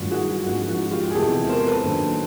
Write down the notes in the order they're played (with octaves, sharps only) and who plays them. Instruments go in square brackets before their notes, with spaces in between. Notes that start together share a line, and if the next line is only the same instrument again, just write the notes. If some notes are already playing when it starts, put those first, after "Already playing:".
Already playing: [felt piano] G2 D#3 F#3 A3 [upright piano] F4 F#4
[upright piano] F#4 G#4
[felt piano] G#2 F3 G#3 C#4 [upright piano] F#4
[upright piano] F#4
F4 G4
G#4
[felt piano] E2 C3 E3 G#3 [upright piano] G4 A4
[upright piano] A#4 C5
A4 B4
[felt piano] D#3 F#3 A#3 D4